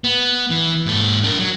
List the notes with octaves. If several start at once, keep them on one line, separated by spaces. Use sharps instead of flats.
B3
E3
G#2 A4
D4 A#4
F#3